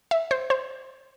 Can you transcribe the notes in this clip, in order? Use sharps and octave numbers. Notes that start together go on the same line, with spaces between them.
E5
C5
C5